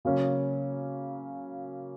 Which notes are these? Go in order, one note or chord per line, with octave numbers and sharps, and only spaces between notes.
C#3 F#3 A#3 C#4